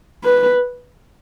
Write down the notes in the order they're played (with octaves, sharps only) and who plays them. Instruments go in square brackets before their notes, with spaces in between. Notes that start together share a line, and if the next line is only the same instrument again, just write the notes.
[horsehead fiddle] B4